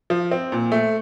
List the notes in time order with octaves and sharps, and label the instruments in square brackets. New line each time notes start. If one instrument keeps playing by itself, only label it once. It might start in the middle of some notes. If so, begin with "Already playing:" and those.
[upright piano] F3
C4
A#2
A3